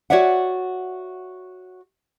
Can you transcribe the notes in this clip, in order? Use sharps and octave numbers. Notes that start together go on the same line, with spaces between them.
F#4 C#5 D5 E5 F#5